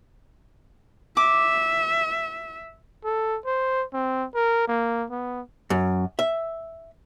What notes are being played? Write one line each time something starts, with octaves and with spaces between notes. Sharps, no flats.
E5 D6
A4
C5
C4
A#4
A#3
B3
F#2
E5